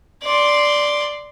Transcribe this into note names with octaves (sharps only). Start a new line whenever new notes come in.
D5 C6